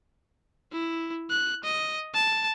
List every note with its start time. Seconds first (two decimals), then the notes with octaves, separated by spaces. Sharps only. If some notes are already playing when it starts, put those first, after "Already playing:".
0.72 E4
1.30 F#6
1.64 D#5
2.14 A5